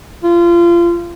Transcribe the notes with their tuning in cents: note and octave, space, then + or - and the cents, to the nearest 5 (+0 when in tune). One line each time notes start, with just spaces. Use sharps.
F4 -25